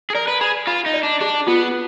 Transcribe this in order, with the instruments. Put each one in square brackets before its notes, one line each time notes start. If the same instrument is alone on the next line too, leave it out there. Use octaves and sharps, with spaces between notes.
[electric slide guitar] G#4
[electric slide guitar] A#4 [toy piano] D5
[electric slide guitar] B4
[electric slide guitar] G#4 [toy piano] B5
[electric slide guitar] F4 [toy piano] B5
[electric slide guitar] D#4
[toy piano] D5
[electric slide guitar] D4
[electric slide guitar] D4 [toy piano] G#4
[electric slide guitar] B3 [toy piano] F4